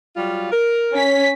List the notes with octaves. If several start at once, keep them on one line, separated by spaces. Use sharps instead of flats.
F#3 G3 F4
A#4
C#4 B6